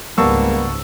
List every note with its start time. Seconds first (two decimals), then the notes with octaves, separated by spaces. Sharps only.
0.18 C#2 G#2 G3 A#3 B3 A5 C#6 E6